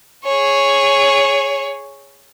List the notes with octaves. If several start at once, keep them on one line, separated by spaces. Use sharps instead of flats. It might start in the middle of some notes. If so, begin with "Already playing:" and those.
G#4 C#5